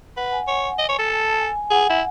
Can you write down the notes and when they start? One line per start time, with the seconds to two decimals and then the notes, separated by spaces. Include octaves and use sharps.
0.17 B4 F#5
0.32 G#5
0.48 C#5
0.79 D#5
0.89 C#5
0.98 A4
1.09 A5
1.39 G#5
1.55 G#5
1.70 G#4 F#5
1.90 E4